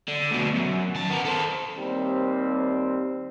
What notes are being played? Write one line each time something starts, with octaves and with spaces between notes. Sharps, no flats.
D3
D2 B2
F#2
D#2 A5
B3 A#4
A4 C5
D#2 G3 C4